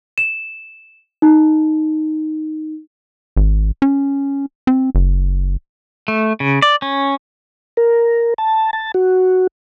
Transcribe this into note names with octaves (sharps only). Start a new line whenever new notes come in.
E7
D#4
G#1
C#4
C4
F#1
A3
C#3
D5
C#4
A#4
A5
A5
F#4